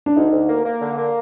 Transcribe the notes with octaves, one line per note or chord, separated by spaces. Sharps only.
D4
D2 D#4
D2
A#3
A#3
D3
A#3